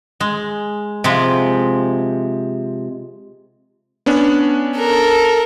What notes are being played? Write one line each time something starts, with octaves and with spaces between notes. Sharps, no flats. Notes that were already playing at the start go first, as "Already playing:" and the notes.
G#3
C3 F3 G#3
B3 C#4 D4
A4 A#4